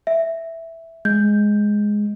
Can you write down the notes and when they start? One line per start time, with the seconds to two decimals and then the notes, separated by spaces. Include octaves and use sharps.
0.07 E5
1.05 G#3 G6